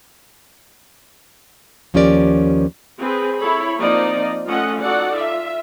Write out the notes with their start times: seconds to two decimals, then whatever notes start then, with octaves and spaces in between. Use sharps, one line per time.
1.94 D#2 F3 C#4 G4 A#4 D5
2.99 C4 G#4 B4
3.39 E4 A4 C#5 B5
3.79 F3 A#3 C4 D#4 D5 D#5
4.47 A3 C#4 F4 A4 D#5 F#5
4.81 D#4 F#4 A4 D5 F#5
5.17 F4 E5